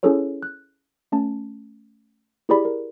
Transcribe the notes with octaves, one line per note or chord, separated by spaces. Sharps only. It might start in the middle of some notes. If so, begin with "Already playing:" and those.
C#4 E4 G#4 A4 B4 C#5
F#6
A3 C#4 A5
E4 G4 G#4 B4 D5 B5
A#4